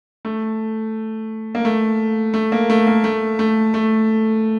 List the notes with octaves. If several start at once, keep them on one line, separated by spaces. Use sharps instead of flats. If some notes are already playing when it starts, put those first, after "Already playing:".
A3
A#3
A3
A3
A#3
A3
A#3
A3
A3
A3